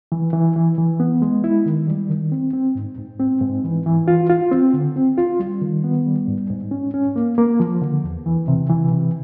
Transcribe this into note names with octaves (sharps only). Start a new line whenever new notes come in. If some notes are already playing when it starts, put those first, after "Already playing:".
E3
E3
E3
E3
B3
G#3
E4
D#3
G3
D#3
C4
C4
G#2
G#2
C4
G#2
E3
E3
F4
F4
C4
D3
C4
F4
G3
D#3
B3
G3
G#2
G#2
C#4
C#4
A#3
A#3
F3
D3
E2
E3
C3
E3
C3